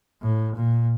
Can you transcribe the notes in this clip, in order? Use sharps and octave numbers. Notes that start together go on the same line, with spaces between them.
A2
A#2